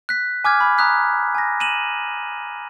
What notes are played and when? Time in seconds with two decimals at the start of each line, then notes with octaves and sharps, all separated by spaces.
0.09 F#6 B6
0.44 G#5 D6 F6 G#6
0.61 B5
0.78 A#5 D#6 F#6 B6
1.35 G#5 A#6
1.60 D#7 E7 F#7